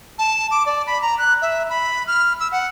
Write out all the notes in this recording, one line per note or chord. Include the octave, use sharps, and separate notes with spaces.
A5
D6
D5
B5
A#5
F#6
E5
B5
F6
E6
F#5